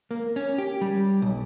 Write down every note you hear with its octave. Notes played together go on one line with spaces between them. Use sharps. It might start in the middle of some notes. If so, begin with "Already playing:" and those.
A#3
C#4
G4
G3
B1